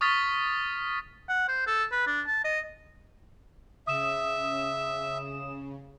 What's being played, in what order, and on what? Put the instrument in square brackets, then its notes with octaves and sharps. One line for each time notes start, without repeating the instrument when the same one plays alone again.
[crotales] C#6 D#6 F6 A6 B6
[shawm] F#5
C5
A4
B4
D4
A5
D#5
[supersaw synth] C#3 [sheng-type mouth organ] E5 [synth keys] D#6 E7